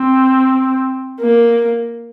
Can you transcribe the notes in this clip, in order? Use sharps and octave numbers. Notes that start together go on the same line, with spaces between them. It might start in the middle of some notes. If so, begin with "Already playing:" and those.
Already playing: C4
A#3